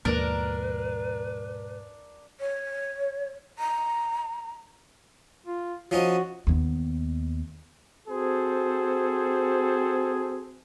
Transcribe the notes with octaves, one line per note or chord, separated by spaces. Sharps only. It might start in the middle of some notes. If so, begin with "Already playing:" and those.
D#2 G#2 B2 F3 A#3 D4 A#4 B4
C#5
A#5
F4
F3 C#4 D#4 F#4
D#2 B3
C4 F#4 G#4 A4 C5